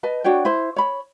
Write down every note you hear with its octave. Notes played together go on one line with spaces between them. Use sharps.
B4 D#5 A5
D4 F#4 C#5 G5
E4 C5
C#5 B5